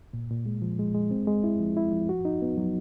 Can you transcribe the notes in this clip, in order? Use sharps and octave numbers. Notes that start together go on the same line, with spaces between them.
A#2
A#2
G#3
F3
G#3
G#3
C4
G#3
E4
F3
E4
F3
F#4
D#4
B3
F#3